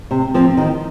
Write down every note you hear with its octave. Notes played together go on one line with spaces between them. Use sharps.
C3
F3 C4
D#3